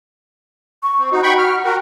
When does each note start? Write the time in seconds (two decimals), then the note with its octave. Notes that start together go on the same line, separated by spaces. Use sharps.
0.83 C#6
0.98 C4
1.12 D#4 F#4
1.23 G5 B5 C#6
1.38 F6
1.64 F#4 A#4 G5